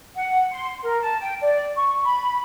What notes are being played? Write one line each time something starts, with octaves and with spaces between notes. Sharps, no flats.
F#5
C6
A#4
A5
G5
D5
C#6
B5